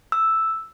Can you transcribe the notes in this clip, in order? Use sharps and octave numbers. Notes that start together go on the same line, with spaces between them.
E6